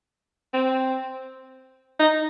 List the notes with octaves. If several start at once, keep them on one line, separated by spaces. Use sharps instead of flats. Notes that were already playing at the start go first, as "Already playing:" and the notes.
C4
D#4